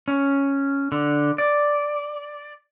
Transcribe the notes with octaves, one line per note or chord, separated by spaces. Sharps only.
C#4
D3
D5